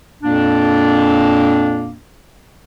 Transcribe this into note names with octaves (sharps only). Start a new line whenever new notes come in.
F2 A#2 A#3 D4